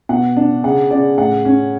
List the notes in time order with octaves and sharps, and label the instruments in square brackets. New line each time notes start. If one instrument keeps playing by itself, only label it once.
[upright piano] B2 F#5
D4
C#3 F#5
C#3 D5
A2 F#5
C#4